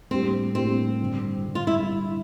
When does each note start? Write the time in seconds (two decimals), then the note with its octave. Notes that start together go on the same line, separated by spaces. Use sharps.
0.11 A2 G3 A#3 C4 D4 G4
0.55 A2 G3 A#3 C4 D4 G4
1.00 G2 D3 G3
1.45 G2 D3 G3
1.55 F4
1.67 E4